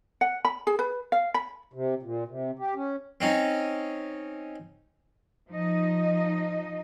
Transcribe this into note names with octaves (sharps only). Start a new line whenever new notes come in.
F#5
B5
G#4
B4
F5
B5
C3
A#2
C3
G4
C#4
C4 C#4 D#4
F3 D#4 D#5